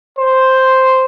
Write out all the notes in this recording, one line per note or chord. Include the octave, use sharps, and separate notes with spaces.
C5